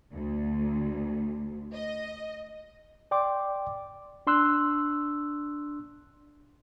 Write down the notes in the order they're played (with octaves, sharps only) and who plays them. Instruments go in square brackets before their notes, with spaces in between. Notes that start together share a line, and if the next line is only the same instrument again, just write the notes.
[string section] D2
D#5
[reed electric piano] D5 G5 C6 D6
[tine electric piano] D4 C6 E6 F#6